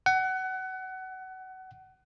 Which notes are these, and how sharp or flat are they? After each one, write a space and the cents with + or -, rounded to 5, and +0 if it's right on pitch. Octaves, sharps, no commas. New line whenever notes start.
F#5 +25